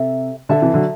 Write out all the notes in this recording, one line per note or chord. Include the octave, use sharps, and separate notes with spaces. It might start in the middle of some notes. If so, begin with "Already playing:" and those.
Already playing: C3 A4 E5
D3 A4 E5 A5
C3 E3
D3 F#3